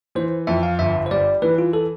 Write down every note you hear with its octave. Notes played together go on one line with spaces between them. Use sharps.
E3 C5
F2 E5
F5
G1 E5
C5
G3 D5
E3 B4
F4
A4